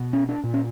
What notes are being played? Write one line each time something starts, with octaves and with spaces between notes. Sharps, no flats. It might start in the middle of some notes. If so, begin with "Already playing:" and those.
Already playing: B2
C#4
D4
A#2
C#4